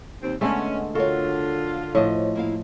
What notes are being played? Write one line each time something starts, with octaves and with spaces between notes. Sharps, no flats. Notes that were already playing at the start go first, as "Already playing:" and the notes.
D#2 C4
D3 G#3 A3 B3 C#4 D#5 G#5
D3 F4 F#4 A4 A#4 C#5
A2 F3 C5 C#5 D#5
A#3 E4 F5